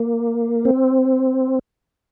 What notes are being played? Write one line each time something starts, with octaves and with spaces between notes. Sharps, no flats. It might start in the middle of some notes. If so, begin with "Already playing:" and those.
Already playing: A#3
C4